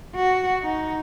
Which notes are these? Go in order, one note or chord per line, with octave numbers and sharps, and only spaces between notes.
F#4
D#4